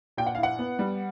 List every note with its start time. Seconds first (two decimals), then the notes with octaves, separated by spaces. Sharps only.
0.17 A#2 G5
0.27 F#5
0.35 E4 F5
0.43 F#5
0.59 B3
0.79 G3